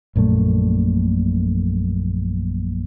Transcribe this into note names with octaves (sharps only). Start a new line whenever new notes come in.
A#1 F#2 A#2 A3